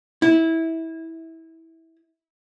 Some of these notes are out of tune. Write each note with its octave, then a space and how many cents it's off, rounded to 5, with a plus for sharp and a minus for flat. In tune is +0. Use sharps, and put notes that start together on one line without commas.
E4 -20